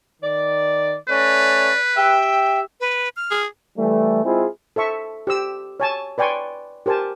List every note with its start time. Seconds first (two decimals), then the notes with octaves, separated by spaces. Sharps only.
0.22 D#3 D5
1.09 A3 C#4 B4 C#5 D5
1.96 G4 E5 G5
2.80 B4
3.17 F6
3.31 G#4
3.77 E3 G3 A3
4.24 G#3 C4 E4 F4 G#4
4.76 A4 C5 E5 C#6
5.27 G4 C5 E6
5.80 C#5 G#5 A5
6.18 B4 D5 G5 G#5 C6 C#6
6.86 G4 A#4 C5 G#5 A5